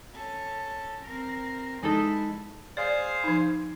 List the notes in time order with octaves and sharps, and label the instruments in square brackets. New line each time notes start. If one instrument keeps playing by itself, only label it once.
[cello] C#4 A4
C4 A#4
[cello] F3 E4 [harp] G#3 D#4 A4
[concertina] G#4 C5 F5 [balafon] D5
[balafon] F3 D#4